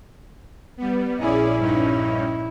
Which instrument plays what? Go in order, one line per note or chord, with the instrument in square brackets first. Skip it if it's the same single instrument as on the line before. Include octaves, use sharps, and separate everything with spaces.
[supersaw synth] G3 B3
[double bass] A#1 E4 [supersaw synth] C#4 G#4 D5
[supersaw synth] G2 C#4 D#4